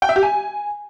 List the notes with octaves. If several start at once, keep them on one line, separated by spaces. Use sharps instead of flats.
G5
E5
G4
G#5